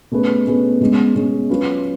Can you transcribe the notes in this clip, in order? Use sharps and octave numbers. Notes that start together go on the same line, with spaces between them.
B2 A3 C#4 G#4 B4
B2 A3 C#4 G#4 B4
B2 G#3 C#4 G#4
B2 G#3 C#4 G#4
F#3 C#4 F4 B4